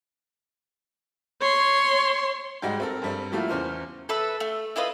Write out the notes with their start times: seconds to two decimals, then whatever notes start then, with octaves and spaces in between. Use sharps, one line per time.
1.41 C#5 C6
2.62 G#2 G3 G#3 F#4 G5
2.80 C4 A4 A#4
3.02 G2 G3 C4
3.32 F3 G3 A3 A#3 E4 F#4
3.48 E2 C#4 C5 F6
4.09 A4 B4 E5
4.40 A3
4.76 E4 F4 B4 D#5